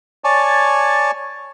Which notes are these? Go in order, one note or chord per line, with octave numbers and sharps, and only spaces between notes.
C#5 D5 G#5 A5